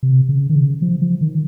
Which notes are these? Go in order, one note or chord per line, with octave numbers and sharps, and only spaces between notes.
C3
C#3
D#3
C#3
F3
F3
D#3